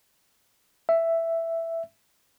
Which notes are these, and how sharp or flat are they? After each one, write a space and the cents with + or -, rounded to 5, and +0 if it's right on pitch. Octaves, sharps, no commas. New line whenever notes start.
E5 +5